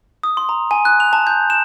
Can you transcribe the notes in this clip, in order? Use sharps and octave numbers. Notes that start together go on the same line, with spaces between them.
D#6
C6
A#5
G#5
F#6
F7
A5
G6
E7